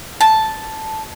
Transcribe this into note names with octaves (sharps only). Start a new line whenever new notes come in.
A5